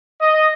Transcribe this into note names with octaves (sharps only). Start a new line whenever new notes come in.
D#5